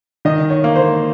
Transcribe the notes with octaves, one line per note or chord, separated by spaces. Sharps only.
D#3 D#5
C#5
A#3
C5